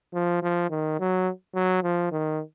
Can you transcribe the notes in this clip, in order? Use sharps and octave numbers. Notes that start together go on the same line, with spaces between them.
F3
F3
D#3
F#3
F#3
F3
D#3